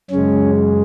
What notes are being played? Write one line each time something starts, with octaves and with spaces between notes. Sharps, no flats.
F#2 C#3 G#3 C#4